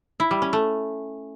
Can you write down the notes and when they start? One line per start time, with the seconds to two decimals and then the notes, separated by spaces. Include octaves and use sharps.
0.20 E4
0.31 G3
0.42 C#4
0.53 A3